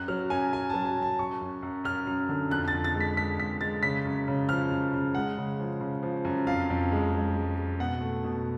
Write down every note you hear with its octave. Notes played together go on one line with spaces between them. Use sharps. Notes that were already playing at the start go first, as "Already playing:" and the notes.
Already playing: F#2 F#6
F#3 F6
F#2 G#5
F#2 G#5
F#3 A5
G#5
F#2
A5
F#2 C#6
F#2
F#2
F#2 F6
F#2
D3
F2 F#6
F2 A6
A6
G#3
B6
G#3 B6
F2 B6
G#3 A6
C#3 B6
F#2
C#3
F3 F6
F#2
C#3
G#3 F#5
C#3
F3
C#3
F3
F#2
F2 F5
F2
G#3
G#3
G#3
G#3
B2 F#5
A3
B2